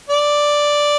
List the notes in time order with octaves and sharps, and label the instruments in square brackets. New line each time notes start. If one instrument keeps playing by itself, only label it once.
[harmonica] D5